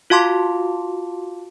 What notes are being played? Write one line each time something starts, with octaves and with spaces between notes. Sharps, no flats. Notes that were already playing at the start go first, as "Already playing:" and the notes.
F4 F#4 F5 A5 C6 D6